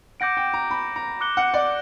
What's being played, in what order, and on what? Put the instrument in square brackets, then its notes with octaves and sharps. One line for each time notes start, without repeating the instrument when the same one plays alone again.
[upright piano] F#5 [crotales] D6 G6 A#6 D7
[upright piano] G5
A#5
B5
A#5
[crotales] D6 F#6 C#7 G7
[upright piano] F#5
D5